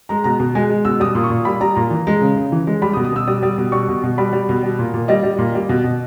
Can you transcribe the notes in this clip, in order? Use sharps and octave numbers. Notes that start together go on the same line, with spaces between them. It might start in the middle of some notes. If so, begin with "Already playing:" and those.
G#3 A#5
B2 A#5
B2
G#3 G#5
G#3
B2 E6
G3 D#6
A#2
C#6
A#2
G3 B5
G3 A#5
A#2 A#5
E3
G#3
C#3
C#3
E3
G#3
G3 B5
D#6
B2
D#6
B2 E6
G3 D#6
G3
B2
G3 C#6
B2
B2
G3 B5
G3
B2
G3
A#2
A#2
G3 D#5
G3
A#2
G3
B2
B2